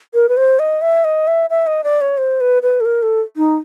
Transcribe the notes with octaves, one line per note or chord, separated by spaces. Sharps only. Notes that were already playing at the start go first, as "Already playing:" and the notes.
A#4
B4
C5
D#5
E5
D#5
E5
E5
D#5
D5
C#5
C5
B4
B4
A4
A#4
A4
D#4